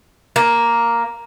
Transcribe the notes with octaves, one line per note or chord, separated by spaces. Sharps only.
A#3